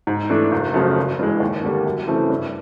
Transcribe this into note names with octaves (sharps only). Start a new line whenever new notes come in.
G#2
E3 A3 D4
F#1
F#2 C#3 F3 A3
G#1
G2 E3 G#3
D#2
D3 G3 A#3
F#2
C#3 E3 A3 C4
G2